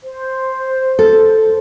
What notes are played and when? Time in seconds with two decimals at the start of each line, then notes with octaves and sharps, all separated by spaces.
0.04 C5
0.99 A4